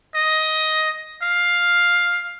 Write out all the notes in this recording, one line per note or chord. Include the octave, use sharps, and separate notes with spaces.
D#5
F5